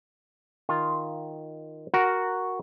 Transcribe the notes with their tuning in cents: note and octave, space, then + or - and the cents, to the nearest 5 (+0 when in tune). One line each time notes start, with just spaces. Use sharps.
D#3 +0 F4 +0
F#4 +0 A#4 +0 F#5 +0